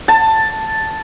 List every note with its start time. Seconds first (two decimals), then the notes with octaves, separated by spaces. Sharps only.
0.08 A5